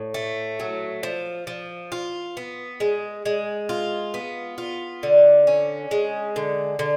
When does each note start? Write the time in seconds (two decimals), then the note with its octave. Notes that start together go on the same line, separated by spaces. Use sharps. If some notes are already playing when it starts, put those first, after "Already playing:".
Already playing: A2
0.14 A3
0.60 F#3
1.03 F3
1.47 F3
1.92 F4
2.37 B3
2.80 G#3
3.26 G#3
3.69 F4
4.14 B3
4.58 F4
5.03 D3
5.47 C#4
5.91 G#3
6.36 D3
6.79 D3